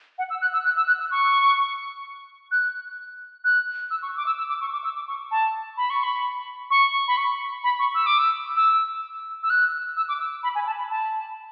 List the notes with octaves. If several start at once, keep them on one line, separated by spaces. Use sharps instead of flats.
F#5
E6
F#6
E6
F#6
E6
F#6
E6
C#6
F#6
F#6
E6
C#6
D6
E6
E6
D6
C#6
D6
E6
D6
C#6
A5
B5
C#6
B5
C#6
B5
C#6
B5
C#6
E6
D6
E6
E6
E6
F#6
E6
D6
E6
B5
G#5
A5
B5
A5